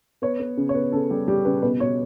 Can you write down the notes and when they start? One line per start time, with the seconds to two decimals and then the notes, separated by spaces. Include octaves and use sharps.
0.22 B3 C#5
0.40 B3
0.57 C#3
0.69 C#5
0.74 B3
0.92 C#3 A4
1.10 G3 G4
1.28 G3 G4
1.45 C#3 B4
1.62 B2 B4
1.80 B2 C#5